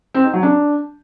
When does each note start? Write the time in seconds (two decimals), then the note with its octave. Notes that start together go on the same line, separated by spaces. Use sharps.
0.14 C4
0.24 D#4
0.33 F#3
0.43 D4